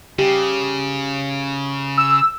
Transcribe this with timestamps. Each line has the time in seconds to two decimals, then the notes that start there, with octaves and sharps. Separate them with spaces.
0.19 C#3 G4
1.98 E6